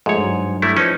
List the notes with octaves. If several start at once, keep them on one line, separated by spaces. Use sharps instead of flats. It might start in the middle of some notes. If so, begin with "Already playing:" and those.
G#2 F3 G#3 A3 C#5
G2 F#3
G3 A3 E4
F3 C#4 D#4 B4